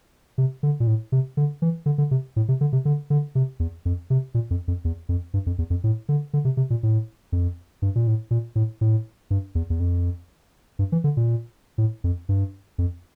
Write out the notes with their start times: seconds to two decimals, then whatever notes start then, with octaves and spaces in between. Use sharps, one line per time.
0.38 C3
0.63 D3
0.80 A#2
0.87 A2
1.12 C3
1.37 D3
1.62 E3
1.86 D3
1.98 D3
2.11 C3
2.36 A2
2.48 C3
2.61 D3
2.73 C3
2.85 D3
3.10 D3
3.35 C3
3.60 E2
3.85 F2
4.10 C3
4.34 A#2
4.51 F2
4.68 F2
4.85 E2
5.09 F2
5.34 G2
5.46 F2
5.58 E2
5.70 F2
5.84 A2
6.09 D3
6.33 D3
6.45 C3
6.57 C3
6.70 A#2
6.83 A2
7.32 F2
7.82 G2
7.95 A#2
8.07 A2
8.31 A#2
8.56 A2
8.81 A2
9.30 G2
9.55 E2
9.70 E2
9.80 F2
10.79 G2
10.92 E3
11.04 D3
11.17 A#2
11.78 A2
12.04 F2
12.29 G2
12.78 F2